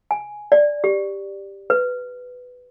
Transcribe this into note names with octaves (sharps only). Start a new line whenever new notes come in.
G#5
D5
G4
B4